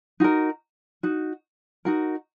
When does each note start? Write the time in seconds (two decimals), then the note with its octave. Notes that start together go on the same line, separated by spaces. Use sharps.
0.20 D#4 F#4 A#4
1.03 D#4 F#4
1.85 D#4 F#4 A#4